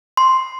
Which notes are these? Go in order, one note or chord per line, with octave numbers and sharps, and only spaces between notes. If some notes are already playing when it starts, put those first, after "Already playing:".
C6